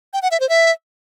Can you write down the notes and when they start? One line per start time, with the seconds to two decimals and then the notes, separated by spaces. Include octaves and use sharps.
0.13 G5
0.22 F#5
0.31 E5
0.40 C5
0.49 E5